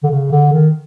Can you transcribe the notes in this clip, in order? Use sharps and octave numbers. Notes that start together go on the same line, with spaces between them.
D3
C#3
D3
D#3